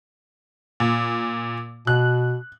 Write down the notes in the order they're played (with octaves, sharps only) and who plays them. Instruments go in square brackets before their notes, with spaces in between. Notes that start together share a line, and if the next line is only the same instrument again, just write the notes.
[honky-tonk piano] A#2
[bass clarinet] B2 [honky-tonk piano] F#6